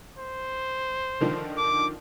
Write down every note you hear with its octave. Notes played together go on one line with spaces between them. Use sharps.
C5
D3 D#3 F3
D6